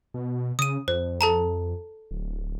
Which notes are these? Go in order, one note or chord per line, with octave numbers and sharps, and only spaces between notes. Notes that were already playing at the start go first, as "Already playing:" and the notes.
B2
C#3 D#6 D#7
F2 C5
A4 A5 A#5
D1